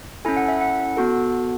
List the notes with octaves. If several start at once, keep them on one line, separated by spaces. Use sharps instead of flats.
C#4 E4 A4 G#5
F#5
E5
F#5
B3 F#4 A4